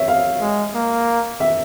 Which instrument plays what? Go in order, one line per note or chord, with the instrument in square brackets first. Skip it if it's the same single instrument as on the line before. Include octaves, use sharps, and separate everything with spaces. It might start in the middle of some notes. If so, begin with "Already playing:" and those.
Already playing: [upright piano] C#5 E5
F5
[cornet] G#3
A#3
[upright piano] E5